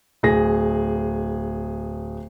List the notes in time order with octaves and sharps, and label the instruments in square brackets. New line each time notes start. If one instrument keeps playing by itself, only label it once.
[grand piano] D1 G#4 A#6